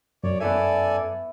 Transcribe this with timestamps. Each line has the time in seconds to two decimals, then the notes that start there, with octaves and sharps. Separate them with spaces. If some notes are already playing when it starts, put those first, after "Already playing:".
0.24 F#2 C#5 D5
0.40 B3 E4 A4 D5 E5 G#5